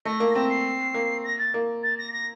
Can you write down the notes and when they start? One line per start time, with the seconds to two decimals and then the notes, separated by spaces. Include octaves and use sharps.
0.05 A3 A#6
0.20 A#3
0.35 C4 A#6
0.50 C7
0.94 A#3
1.24 A#6
1.39 A6
1.54 A#3
1.83 A6
1.98 A#6
2.13 A#6